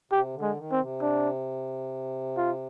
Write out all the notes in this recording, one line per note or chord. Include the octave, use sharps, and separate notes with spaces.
C3 G4
D3
G#3
D#3
C4
C3
D4
F4